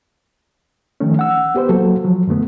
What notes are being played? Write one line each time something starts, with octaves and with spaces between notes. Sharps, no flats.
D#3 F3 A3 C#4
F#5 E6
B3 G4 B4 C5
F#3 A#3 F#4 A4
F3 F#3
F#2 D3 A3 B3